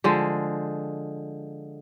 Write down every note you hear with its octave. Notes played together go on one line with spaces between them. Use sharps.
D3 F3 G#3